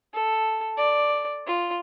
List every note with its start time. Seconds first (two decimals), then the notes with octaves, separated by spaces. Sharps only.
0.14 A4
0.78 D5
1.47 F4